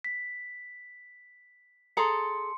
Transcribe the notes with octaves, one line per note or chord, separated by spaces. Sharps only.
B6
G#4 A4 A#5 C6 C#7